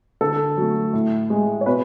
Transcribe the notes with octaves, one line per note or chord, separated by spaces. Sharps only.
D3 A4
F#3 A3
A2
G#3
C#5
B2 B4